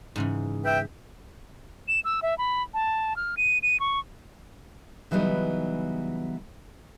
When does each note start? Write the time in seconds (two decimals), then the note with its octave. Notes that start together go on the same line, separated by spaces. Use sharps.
0.16 G#2 C#3 E3
0.64 B4 E5 G5
1.88 E7
2.04 E6
2.22 E5
2.38 B5
2.74 A5
3.16 F6
3.37 D#7
3.63 D#7
3.80 C#6
5.11 C#3 E3 F#3 G3 B3 D#4